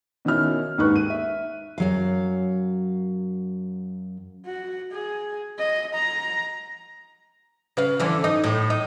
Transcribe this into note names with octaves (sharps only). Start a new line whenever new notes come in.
B2 D#3 C#4 E4 F6
D#2 G#2 D#4 B4 C#6 F#6
D#7
E5
F#2 F#3 F5
F#4
G#4
D#5
A#5
C#3 B4 F5
D3 E3 F3
D#4 D#5
A2
D#4